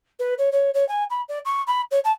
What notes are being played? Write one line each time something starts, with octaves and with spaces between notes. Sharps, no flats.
B4
C#5
C#5
C#5
G#5
B5
D5
C#6
B5
C#5
A5